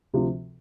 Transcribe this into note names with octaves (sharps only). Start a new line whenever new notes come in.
D2 C3 F3